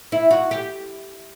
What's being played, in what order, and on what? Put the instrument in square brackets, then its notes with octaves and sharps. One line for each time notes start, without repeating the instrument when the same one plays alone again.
[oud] E4
F#4
G4